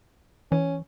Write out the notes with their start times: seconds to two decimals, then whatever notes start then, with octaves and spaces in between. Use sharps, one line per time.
0.52 E3 C#4